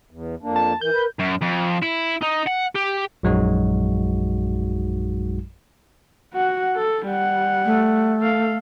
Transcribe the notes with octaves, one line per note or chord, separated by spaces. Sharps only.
E2
F2 A#3 D4
A5
E3 A#4 G6
B4
F#2
F2
E4
D#4
F#5
G4
A#1 F#2 F#3 G#3 D#4 F#4
F#4 F#5
A4
G3 F#5
A3
A4 F5